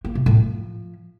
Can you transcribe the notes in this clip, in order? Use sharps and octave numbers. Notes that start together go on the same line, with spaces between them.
A#3
C3
A2
F3